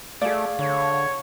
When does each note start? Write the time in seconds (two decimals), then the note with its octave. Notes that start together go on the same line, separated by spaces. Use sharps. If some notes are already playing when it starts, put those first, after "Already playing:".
0.21 A3 G#4 D5 F5
0.59 D3 C#5